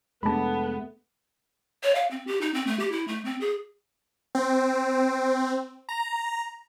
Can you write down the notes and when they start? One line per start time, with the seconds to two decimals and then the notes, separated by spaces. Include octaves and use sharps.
0.23 F1 G#2 G#3 A3 B3 D4 A5 B5
1.83 C#5
1.95 F5
2.11 C4
2.27 G4
2.41 D#4
2.54 C4
2.67 A3
2.79 G4
2.92 E4
3.08 A3
3.25 C4
3.41 G#4
4.35 C4
5.89 A#5